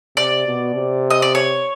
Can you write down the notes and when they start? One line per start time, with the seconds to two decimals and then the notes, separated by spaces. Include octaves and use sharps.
0.17 C3 D5
0.46 B2
0.75 C3
1.10 D#5
1.22 D5
1.35 C#5